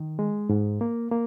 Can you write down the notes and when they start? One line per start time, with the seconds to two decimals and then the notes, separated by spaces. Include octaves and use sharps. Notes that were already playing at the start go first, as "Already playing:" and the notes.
Already playing: D#3
0.19 G#3
0.49 G#2
0.81 A#3
1.12 A#3